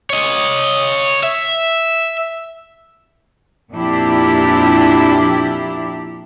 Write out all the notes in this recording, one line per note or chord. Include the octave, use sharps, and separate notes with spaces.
C#5 D#5
E5
F2 A#2 D4 E4 G4